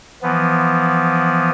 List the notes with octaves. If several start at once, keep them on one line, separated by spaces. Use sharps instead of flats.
E3 F3 B3